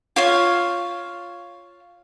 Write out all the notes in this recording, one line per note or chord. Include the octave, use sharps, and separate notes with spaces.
F4 C#5 F5